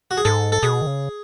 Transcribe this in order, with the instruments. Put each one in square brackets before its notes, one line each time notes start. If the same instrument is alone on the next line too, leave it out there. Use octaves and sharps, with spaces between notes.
[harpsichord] F#4
G#4
[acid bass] G#2 [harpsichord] A4
[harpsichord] A4
[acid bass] B2 [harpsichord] G#4
[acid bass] D#3
C#3